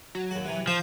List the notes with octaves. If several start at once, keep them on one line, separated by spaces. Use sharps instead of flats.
F#3
D#2 F#4
C3 E3
F3 F4 C5 F5 G6